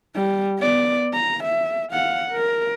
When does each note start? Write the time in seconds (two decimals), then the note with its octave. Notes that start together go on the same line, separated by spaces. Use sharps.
0.15 G3
0.59 B3 D5
1.13 A#5
1.44 E5
1.92 F5 F#5
2.31 A#4